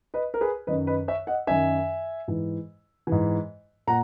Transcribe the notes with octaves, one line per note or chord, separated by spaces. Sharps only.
B4 D#5
A#4
G#4 B4
F#2 D#3 B4 D#5
B4 D#5
C#5 E5
D#5 F#5
F#2 D#3 E5 G#5
G#2 E3
G#2 E3
A#2 F#5 A#5